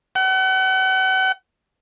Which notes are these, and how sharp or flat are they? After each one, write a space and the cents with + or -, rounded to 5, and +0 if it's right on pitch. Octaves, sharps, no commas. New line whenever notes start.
F#5 +40